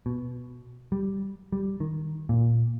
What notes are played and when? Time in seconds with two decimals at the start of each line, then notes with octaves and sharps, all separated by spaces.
0.06 B2
0.92 G3
1.52 G3
1.80 D#3
2.29 A#2